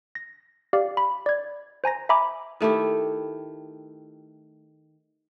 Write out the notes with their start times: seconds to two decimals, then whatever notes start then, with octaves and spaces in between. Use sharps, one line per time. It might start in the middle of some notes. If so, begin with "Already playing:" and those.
0.15 A#6
0.73 G4 D5 F5
0.97 B5
1.26 D5 G#6
1.84 C5 G#5 A#5 A#6
2.09 E5 G#5 A#5 B5 D6
2.61 D#3 A3 E4 G4